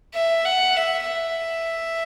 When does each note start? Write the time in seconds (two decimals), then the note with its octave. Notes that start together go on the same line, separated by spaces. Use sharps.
0.14 E5
0.45 F#5
0.76 E5
1.07 E5